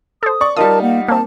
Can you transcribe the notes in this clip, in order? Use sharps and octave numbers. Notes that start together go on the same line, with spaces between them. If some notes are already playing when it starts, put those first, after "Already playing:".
A4 C5 D#6
D5 C#6
G3 D#4 F4 A#4 A5 D#6
A#3 F#5
A#3 C4 A5